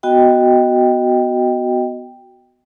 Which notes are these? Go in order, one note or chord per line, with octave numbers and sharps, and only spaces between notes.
B3 F#4 D#5 G5